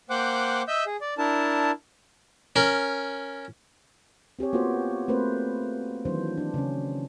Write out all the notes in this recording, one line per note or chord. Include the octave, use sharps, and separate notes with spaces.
A#3 C5 F#5 G5 D6 F#6
D#5 E5 E6 G6
G#4
D5
D4 E4 A#4 A5
C#4 A#4
C4 G4 G#4 C#5
A#3 B3 F4 F#4 C5
A3 A#3 C4 B4 C5
D#3 E3 F#3 D4 C5
D4
C#3 C#4